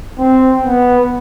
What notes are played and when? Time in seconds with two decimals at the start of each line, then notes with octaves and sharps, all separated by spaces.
0.18 C4
0.65 B3